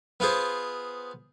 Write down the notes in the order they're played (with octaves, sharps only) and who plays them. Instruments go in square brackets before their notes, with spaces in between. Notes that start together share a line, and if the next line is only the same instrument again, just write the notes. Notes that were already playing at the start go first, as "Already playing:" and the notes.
[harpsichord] B3 F4 G#4 C5